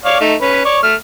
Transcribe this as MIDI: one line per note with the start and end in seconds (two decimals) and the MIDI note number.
0.05 0.18 73
0.05 0.18 74
0.05 0.18 77
0.21 0.34 57
0.21 0.34 63
0.41 0.64 61
0.41 0.64 71
0.65 0.78 73
0.65 0.78 74
0.65 0.78 85
0.83 0.94 57
0.83 0.94 89